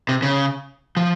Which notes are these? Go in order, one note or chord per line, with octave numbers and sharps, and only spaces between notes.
C3
C#3
F3